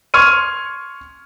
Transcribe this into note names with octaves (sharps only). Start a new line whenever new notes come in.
C6 C#6 F6 G#6 D#7